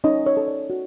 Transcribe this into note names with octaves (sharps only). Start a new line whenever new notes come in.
C#4 D#4 D#5
C#5
A4
D5
F#4